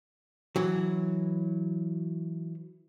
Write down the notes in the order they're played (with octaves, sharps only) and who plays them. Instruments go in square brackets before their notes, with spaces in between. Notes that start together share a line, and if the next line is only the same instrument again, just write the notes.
[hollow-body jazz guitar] E3 F#3